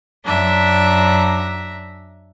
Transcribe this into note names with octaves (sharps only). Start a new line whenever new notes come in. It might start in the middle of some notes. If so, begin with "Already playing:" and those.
F#2 D4 E5 A#5